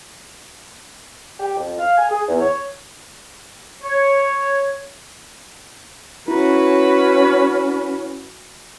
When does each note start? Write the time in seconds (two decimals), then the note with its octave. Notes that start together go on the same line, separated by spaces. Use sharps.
1.40 G4
1.56 F2
1.78 F5
1.97 G#5
2.09 G#4
2.28 E2
2.40 C#5
3.82 C#5
6.28 C#4 E4 F#4 B4